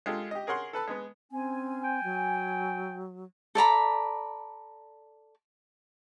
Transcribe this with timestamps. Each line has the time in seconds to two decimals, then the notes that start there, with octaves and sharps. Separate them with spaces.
0.06 G#3 F4 G4 A4
0.31 G4 D#5
0.47 G#4 A#4 C#5 F#5 C6
0.73 A4 B4 A5 E6
0.88 G#3 B3
1.32 C4 C#4 G#5
1.84 G5
2.04 F#3
3.55 A4 D5 A#5 B5